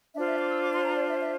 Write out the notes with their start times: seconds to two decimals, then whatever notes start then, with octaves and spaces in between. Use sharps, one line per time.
0.15 D4 F4 C5 E5
0.26 E5
0.38 D6
0.49 E6
0.61 D6
0.72 C6
0.83 A#5
0.94 D5
1.06 E5
1.18 E5